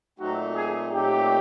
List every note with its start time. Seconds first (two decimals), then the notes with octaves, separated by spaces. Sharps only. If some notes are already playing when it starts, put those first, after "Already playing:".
0.19 A#2 F#3 A3 C4 D#4 F#4
0.56 G#4
0.92 A#2 F#3 A3 C4 D#4 G4